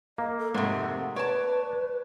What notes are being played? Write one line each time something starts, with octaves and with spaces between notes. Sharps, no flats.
A#3 D#5
A4
F2 G#2 C3 A3 F#5
B4 C#5 D5 A5